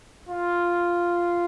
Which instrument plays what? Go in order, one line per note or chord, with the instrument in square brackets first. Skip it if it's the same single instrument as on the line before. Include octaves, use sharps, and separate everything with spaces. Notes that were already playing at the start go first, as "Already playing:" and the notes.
[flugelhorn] F4